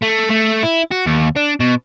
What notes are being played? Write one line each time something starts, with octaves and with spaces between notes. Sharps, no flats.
A3
A3
E4
F#4
D#2
D4
B2